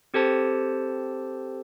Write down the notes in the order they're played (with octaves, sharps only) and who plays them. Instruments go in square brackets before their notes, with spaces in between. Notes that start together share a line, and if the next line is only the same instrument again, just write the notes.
[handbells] C4 G4 A4 C5 A5